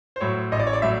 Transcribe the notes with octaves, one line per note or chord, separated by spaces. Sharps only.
C5
A2 F#3 C#5
A1 D#5
D5
C#5
D5
A2 F#3 E5